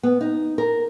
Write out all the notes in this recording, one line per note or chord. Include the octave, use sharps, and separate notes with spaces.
B3
D#4
A#4